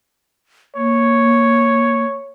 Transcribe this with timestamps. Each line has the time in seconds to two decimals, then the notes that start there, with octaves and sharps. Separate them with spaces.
0.76 A#3 C#5